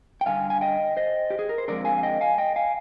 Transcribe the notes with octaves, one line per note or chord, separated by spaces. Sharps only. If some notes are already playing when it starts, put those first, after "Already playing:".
G5
G2 D3 G3 F5 G#5
G#5
D#5 G5
C5 D#5
G4
G#4
A#4
C5
D3 F3 G#3 C4 A#4 D5
F5 G#5
F5
D#5 G5
F5 G#5
D#5 G5
F5 G#5